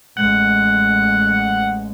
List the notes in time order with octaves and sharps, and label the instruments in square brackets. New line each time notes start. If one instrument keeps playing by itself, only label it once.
[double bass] A1 G#3 [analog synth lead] F#5